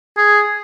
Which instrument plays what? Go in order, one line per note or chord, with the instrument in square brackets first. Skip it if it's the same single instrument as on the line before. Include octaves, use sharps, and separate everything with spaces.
[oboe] G#4